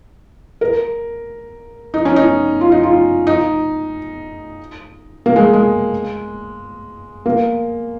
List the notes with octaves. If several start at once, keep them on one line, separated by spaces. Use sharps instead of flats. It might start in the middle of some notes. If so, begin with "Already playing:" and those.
A#4
D#4
C#4
D#4
F4
D#4
F4
D#4
A#3
G#3
G#3
A#3